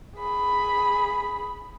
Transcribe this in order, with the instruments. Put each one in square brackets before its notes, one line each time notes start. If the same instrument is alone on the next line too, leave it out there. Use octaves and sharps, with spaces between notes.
[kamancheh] G#4 B5